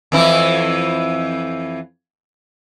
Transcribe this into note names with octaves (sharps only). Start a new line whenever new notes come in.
F2 E3 E4